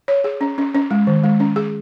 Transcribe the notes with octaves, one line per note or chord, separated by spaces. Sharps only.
C#5
G#4
C#4
C#4
C#4
G#3
D#3
G#3
C#4
G#4